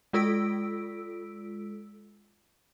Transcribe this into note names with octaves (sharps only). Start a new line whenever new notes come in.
G#3 F4 A4 E6 B6 D7